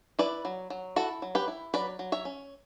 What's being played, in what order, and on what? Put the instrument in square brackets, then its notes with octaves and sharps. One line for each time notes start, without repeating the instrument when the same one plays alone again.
[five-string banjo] E4 B4 D5
F#3
F#3
E4 F#4 A4
F#3
G4 B4
E4
F#3 B4 D5
F#3
C#5 E5
C#4